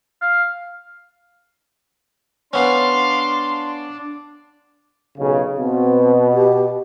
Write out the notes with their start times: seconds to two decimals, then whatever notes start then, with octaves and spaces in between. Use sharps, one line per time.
0.21 F5
2.53 B3 C#4 D4 D5 F5 C6
5.17 B1 C#3
5.58 B2 C4
6.34 G4